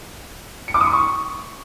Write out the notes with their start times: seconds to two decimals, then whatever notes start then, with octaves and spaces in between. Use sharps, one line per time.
0.68 C#7
0.74 D6
0.81 D#6
0.87 B5
0.93 C#6